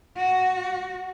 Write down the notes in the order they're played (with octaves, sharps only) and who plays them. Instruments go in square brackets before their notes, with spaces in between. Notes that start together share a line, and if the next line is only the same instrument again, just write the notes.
[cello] F#4